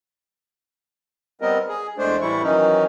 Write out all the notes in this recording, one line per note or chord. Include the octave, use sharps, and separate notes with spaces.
G3 B3 C4 A#4 D#5
G#4
E2 G#3 A3 D4 C5
A2 E3 G3 E4 C#6
D#3 E3 F#3 C#4 D#4